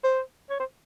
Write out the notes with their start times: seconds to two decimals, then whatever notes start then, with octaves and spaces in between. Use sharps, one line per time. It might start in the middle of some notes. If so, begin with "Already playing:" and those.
0.04 C5
0.50 C#5
0.60 C5